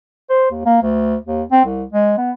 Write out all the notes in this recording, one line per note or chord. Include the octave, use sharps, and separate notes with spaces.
C5
D#2
A#3
D2
D#2
C4
C2
G#3
B3